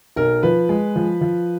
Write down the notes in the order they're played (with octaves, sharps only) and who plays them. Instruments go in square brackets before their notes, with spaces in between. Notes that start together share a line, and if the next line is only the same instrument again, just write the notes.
[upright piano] B1 A#4
F3 B4
G#3
F3
F3